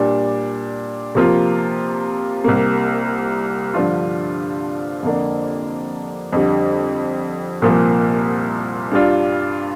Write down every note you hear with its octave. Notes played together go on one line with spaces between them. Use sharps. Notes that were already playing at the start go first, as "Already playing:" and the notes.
Already playing: A#2 G3 D4
C3 F3 A#3 F4
C2 C3 A#3
G2 D3 F3 D4 F4
F2 D3 A#3 D4
F2 D3 G3
C2 A#2 F3 A#3
G2 G3 D4 F4